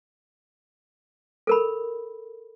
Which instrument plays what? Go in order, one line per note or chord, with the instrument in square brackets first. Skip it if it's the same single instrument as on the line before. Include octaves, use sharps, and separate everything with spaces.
[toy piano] A4 A#4 B5